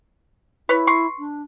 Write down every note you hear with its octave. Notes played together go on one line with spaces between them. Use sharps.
E4 B4 C#5
C6 C#6
D4